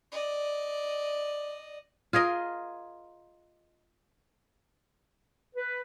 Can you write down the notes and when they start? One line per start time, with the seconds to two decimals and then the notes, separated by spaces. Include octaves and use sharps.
0.12 D5 D#5
2.13 F4 G#4 A#4 D#5
5.56 B4